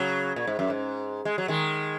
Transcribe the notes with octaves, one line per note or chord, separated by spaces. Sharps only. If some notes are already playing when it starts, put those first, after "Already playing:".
Already playing: C#3 F#3
A#2
G#2
F#2
G#2
G#3
F#3
D#3 G#3